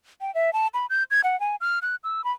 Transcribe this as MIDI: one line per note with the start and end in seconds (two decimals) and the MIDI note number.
0.21 0.33 79
0.35 0.53 76
0.53 0.67 81
0.74 0.86 83
0.90 1.03 91
1.11 1.21 92
1.24 1.39 78
1.40 1.56 80
1.61 1.79 89
1.82 1.96 90
2.04 2.24 88
2.24 2.32 83